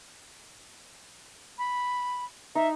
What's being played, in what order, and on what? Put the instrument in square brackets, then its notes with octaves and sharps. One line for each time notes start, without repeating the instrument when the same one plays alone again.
[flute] B5
[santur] D#4 [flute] E5